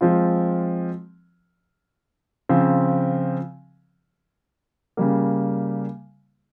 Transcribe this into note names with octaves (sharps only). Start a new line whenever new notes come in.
F3 G#3 C4 F4
C#3 F3 C4
C#3 G3 A#3